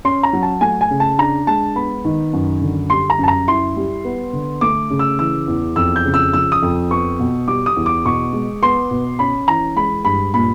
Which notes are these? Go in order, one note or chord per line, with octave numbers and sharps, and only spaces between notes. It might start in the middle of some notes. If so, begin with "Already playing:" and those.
C#4 C6
A#5
F#3
A5
A3 G#5
G#5
C#3
A5
D4 A#5
G#3 A5
B3 B5
D#3
F#2
D3
G3 C6
A#5
F#2 A5
A#5
E4 C6
G3
B3
D3
A3 D6
C#3
E6
E3 E6
E2
F2 E6
G6
C#3
E6
F3 E6
D#6
F2
B3 C#6
B2
G3 D6
D#6
E2
D6
B2 C#6
G#3
B3 C6
B2
C#4 B5
E3 A#5
G#3 B5
G2 B5
A#2 B5